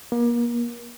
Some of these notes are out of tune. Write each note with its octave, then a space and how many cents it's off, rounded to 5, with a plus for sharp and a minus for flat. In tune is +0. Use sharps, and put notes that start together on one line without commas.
A#3 +35